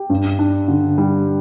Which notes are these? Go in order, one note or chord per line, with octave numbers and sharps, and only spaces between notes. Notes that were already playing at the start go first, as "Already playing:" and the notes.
Already playing: G4
G2
D4
D3
G3